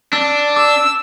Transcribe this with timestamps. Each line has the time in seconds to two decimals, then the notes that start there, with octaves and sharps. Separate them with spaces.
0.13 D4 E6
0.56 D6 E6